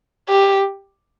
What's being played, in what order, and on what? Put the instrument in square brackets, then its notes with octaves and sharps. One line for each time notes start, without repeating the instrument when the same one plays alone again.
[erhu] G4